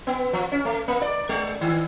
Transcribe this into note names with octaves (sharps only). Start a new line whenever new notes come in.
B3
F3
C#4
A3
A#3
D5
G#3
D#3